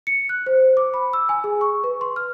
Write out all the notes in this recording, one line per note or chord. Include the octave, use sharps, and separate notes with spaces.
C#7
F#6
C5
D6
B5
E6
G#5
G#4
C#6
B4
C6
F6